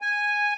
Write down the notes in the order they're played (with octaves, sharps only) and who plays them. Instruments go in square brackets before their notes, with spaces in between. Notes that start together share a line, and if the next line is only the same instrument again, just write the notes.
[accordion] G#5